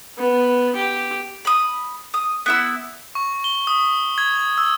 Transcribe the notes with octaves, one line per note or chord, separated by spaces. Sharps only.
B3
G4
B5 D#6
D#6
B3 E4 E6
C#6
G7
D#6
G#6
E6